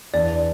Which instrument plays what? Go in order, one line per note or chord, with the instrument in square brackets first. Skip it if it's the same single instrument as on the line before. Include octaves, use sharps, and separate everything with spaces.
[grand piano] E2 E3 D4 [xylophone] D5